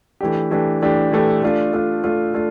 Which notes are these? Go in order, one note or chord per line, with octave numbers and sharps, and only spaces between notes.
E3 A3 D4 G4
E3 A3 D4 G4
E3 A3 D4 G4
E3 A3 D4 G4
A3 D4 F4
A3 D4 F4
A3 D4 F4
A3 D4 F4